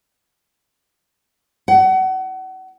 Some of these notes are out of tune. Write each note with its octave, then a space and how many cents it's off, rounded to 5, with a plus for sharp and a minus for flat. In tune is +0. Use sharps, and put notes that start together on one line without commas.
F#5 +30